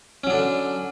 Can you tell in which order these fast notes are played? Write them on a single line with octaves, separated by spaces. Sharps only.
C#4 F#3 D4 D3